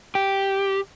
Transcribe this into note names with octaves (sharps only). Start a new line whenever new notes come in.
G4